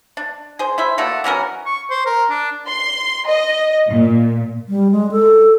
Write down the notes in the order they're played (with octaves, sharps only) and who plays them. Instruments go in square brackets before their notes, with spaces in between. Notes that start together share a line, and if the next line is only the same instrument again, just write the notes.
[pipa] D4
G#4 C5
E4 C5 E5
A3 A#3 D4 F#4
E3 F#3 C#4 A#4
[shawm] C#6
C5
A#4
D4
[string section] C6
D#5
A#2
[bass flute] G3
G#3
A4